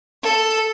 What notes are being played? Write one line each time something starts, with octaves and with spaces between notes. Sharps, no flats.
A4